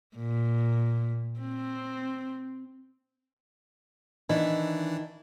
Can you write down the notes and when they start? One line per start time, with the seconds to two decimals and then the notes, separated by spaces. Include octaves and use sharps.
0.16 A#2
1.40 C4
4.29 D#3 E3 D4 E4